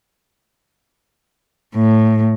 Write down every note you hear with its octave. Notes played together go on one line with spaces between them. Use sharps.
A2